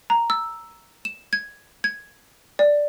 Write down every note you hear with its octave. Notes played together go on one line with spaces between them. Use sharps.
A#5
E6
E7
G#6
G#6
D5